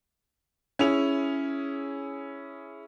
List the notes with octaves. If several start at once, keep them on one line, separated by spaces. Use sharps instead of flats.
C#4 E4 G#4 F7